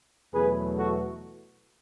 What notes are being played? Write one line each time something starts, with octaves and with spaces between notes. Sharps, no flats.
E2 B2 F#3 A3 G#4 B4
F#4 A4